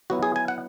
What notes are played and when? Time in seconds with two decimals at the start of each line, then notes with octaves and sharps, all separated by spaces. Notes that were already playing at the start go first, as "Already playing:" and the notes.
0.10 F#3 B3 E4 F#4
0.23 G#4
0.36 G#5
0.48 F#5